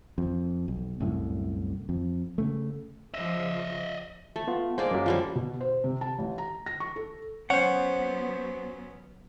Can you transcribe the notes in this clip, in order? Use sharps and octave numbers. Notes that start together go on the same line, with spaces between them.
F2
B1
C2 F#2 A2
F2
C#3 A3
C#3 F3 D#5 E5
A3
B3 F4
G#3 A#3 C5 D5
F#2 F#3
F3 G3 A#3
B2
C5
C3
A5
A1
A#5
A#6
C#6
A4
F#3 B3 C#4 C5 F#5